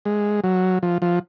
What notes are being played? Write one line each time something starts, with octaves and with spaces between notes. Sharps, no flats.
G#3
F#3
F3
F3